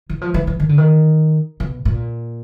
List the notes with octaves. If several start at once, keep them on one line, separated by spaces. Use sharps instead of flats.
E3
F3
E3
E3
D#3
D3
D#3
B2
A#2